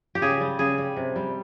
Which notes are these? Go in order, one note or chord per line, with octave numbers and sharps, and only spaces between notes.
G4
C#3 G#4
G3
C#3 G#4
G3
C3
G3